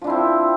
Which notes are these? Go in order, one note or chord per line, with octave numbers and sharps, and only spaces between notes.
F3 C4 D4 E4